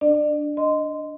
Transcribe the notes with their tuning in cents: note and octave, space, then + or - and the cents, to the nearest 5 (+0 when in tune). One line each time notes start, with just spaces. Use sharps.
D4 +0 D5 +35
D#5 +0 C6 -20